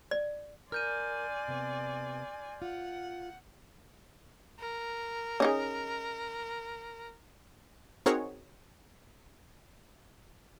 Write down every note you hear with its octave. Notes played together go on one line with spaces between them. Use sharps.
D5
A#4 D5 G#5 C6 F6 G6 D#7
C3 B3
F4 F#5
A#4
C#4 D#4 G#4
C4 D#4 F#4 G#4 A#4 C#5